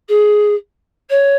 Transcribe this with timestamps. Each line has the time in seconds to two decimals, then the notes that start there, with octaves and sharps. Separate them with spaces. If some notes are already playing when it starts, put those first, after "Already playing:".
0.08 G#4
1.09 C#5